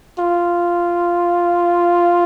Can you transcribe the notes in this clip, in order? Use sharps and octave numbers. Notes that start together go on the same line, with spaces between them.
F4